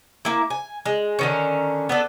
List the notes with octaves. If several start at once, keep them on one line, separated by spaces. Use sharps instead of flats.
A#3 E4
G#5
G#3
D3 D#3 C#4
B3 D4 A4